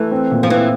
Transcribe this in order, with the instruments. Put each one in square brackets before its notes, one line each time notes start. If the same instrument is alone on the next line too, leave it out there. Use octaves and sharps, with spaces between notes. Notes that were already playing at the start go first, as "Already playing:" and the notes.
Already playing: [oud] E3 [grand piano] A3
[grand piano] C4
A#2
[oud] F3
[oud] E3 [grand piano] C4